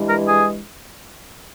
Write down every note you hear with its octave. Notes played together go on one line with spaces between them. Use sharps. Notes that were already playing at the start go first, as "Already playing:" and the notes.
Already playing: G2 E3 G#3
A#4
G#4